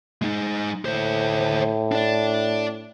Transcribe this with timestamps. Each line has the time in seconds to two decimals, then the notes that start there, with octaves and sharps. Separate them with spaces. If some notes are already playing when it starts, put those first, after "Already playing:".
0.22 G#3 D#4
0.85 D2 A2 C5
1.92 D4 D5